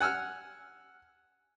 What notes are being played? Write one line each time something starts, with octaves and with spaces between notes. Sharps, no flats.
F#5 G#5 E6 F6